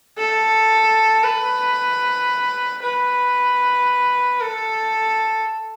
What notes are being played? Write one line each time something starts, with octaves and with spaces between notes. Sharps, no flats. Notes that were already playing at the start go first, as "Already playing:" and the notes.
A4
B4
B4
A4